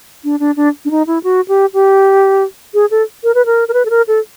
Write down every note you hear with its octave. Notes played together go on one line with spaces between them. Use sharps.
D4
D4
D4
D4
D#4
E4
F#4
G4
G4
G#4
A4
A#4
B4
A#4
A#4
B4
A4
A#4
A4